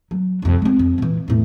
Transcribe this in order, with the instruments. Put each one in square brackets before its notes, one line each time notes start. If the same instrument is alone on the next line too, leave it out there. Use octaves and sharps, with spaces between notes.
[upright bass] F#3
C2 F2
G#3 C4
F2
A#2 E3
E2 A2